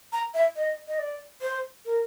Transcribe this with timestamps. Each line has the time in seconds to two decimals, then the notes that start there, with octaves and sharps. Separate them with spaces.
0.12 A#5
0.34 E5
0.56 D#5
0.88 D#5
0.99 D5
1.41 C5
1.85 A#4